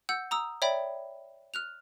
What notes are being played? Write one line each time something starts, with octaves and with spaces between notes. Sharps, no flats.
F#5 E6 G6
A#5 D#6 E6
C#5 D5 E5 G5 B5
F6 F#6 F7